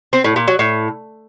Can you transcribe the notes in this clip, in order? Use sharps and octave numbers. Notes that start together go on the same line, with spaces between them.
C4
A2
A#2
F#3
A2